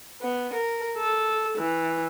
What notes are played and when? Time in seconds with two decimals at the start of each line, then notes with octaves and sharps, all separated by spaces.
0.22 B3
0.53 A#4
0.98 A4
1.58 E3